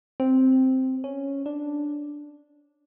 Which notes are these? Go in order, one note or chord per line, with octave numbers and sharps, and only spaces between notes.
C4
C#4
D4